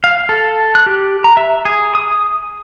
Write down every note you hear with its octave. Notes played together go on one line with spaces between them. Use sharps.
F5
A4
F#6
G4
A#5
E5
G#4
D#6